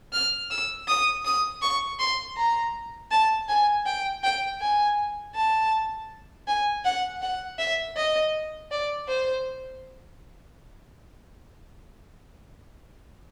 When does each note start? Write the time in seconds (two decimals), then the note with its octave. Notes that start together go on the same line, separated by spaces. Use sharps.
0.13 F6
0.50 E6
0.88 D#6
1.25 D#6
1.62 C#6
1.99 C6
2.37 A#5
3.11 A5
3.48 G#5
3.86 G5
4.23 G5
4.61 G#5
5.35 A5
6.47 G#5
6.84 F#5
7.22 F#5
7.58 E5
7.97 D#5
8.71 D5
9.08 C5